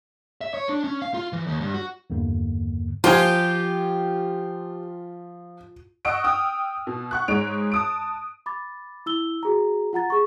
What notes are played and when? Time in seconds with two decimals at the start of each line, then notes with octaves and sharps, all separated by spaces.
0.41 E5
0.54 C#5
0.69 D4
0.84 C#4
1.02 F5
1.14 F4
1.33 E3
1.47 D#2
1.61 G2
1.74 F#4
2.10 E2 G2 D3 A#3
3.04 F3 F4 G4 C5 G#5
6.05 D#5 F#5 C#6 E6 D7
6.24 G5 D#6 F6
6.87 B2
7.11 F#5 C#6 F#6
7.28 G#2 D#4 G#4 C#5 D7 F7
7.72 A5 D#6 D7
8.46 B5 D6 A6
9.06 E4 E6 G7
9.43 F#4 G#4 A#5
9.93 F4 F#5 A#5 A6
10.10 G#4 C#6